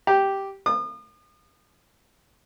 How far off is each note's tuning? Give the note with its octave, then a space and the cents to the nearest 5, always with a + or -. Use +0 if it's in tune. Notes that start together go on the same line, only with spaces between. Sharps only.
G4 -5
D#6 -40